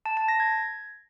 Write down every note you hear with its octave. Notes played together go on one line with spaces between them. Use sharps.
A5
A5
A#6
G#6